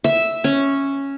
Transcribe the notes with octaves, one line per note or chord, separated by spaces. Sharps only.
E5
C#4